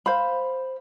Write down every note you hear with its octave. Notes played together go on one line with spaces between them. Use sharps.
C5 F5 B5